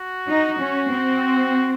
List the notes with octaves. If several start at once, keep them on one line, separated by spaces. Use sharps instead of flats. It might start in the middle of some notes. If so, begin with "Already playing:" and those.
Already playing: F#4
D#4
C#4
C4